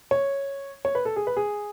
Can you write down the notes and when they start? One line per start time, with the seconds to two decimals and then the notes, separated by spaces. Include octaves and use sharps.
0.11 C#5
0.85 C#5
0.95 B4
1.05 A4
1.16 G#4
1.27 B4
1.37 G#4